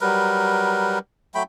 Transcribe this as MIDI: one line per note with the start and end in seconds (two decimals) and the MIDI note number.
0.01 0.99 54
0.01 0.99 55
0.01 0.99 70
0.01 0.99 71
1.35 1.43 54
1.35 1.43 57
1.35 1.43 79
1.35 1.43 83